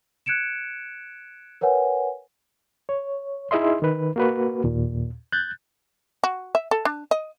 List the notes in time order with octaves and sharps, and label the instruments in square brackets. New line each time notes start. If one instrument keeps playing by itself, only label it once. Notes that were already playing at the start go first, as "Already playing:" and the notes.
[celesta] F#6 G#6 C#7 D7 E7
A#4 B4 C#5 F#5 G#5
[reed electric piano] C#5
D#4 E4 G#4 D#5 E5 C6
D#3 B4
A#3 F#4 B4
D#2 A#2
F#6 G6 A6
[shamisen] F#4
E5
A4
D4
D#5